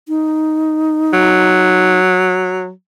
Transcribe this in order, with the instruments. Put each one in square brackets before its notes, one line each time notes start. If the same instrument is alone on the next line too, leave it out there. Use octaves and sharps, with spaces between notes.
[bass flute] D#4
[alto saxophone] F#3